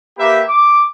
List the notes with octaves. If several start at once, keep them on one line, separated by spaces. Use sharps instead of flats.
A#3 G4 B4 E5
D6